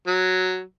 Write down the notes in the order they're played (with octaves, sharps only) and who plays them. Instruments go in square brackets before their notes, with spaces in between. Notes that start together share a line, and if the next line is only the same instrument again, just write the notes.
[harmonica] F#3